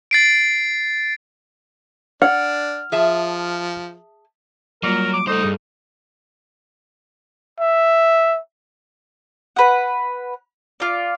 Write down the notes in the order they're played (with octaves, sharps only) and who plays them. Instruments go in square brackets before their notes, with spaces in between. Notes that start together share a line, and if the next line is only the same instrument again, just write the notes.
[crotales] A6 C7 D7
[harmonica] D4 [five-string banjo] F#5 [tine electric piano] F6
[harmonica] F3 [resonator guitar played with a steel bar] G#4 E5 A5
[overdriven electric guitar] F#3 [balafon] G3 A#3 F4 [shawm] A#4
[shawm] D6
[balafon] G3 A4 [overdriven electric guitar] A3 C5 [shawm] D#4
[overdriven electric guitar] G2 [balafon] G#4
[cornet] E5
[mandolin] B4 F#5
F4 D5